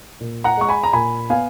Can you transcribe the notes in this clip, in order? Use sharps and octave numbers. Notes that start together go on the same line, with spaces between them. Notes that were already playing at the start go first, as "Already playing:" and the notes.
A#2
F#5 A#5
G#3 C#6
G#5 B5
A#5
A#2 G#5 B5
B3 F5 G#5